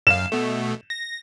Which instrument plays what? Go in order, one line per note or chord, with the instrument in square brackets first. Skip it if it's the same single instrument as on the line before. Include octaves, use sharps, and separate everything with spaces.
[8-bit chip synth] F#2 F5 [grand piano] E7
[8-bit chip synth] B2 A3
A#6